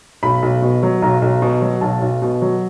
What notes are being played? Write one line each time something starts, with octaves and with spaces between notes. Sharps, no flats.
B1 B5
B1
B2
F#3
B1 A#5
B1
B2
F#3
B1 A5
B1
B2
F#3